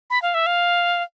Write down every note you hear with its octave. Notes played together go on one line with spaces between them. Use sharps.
B5
F5
E5
F5